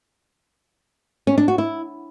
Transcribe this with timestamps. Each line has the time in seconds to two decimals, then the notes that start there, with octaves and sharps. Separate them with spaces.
1.27 C#4
1.38 D4
1.48 F#4
1.58 E4